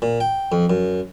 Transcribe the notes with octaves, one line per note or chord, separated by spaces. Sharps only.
A#2
G5
F2
F#2